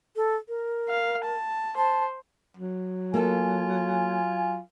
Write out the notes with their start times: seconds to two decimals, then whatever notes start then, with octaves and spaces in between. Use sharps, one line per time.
0.16 A4
0.48 A#4
0.89 F5
1.24 A5
1.77 C5 A5
2.57 F#3
3.14 A#3 F4 A4 G#5